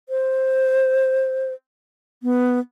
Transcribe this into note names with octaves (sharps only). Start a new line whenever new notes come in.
C5
B3